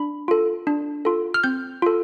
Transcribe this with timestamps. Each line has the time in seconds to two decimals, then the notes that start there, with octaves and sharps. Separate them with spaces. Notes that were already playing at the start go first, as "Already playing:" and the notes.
Already playing: D4 B5
0.28 F4 A4
0.67 D4
1.05 F4 A4
1.34 F6
1.44 C4 G6
1.82 F4 A4